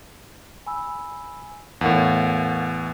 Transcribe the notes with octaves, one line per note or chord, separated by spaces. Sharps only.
G#5 B5 E6
E2 A2 A#4 F5 F#5